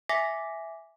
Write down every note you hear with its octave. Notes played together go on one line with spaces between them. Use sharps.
E5 G#5 D6 A#6 B6